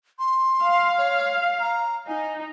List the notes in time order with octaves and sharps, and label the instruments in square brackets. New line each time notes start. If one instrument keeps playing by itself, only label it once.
[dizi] C6
[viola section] F5
[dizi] C#5
A#5
[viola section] D#4 [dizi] G#5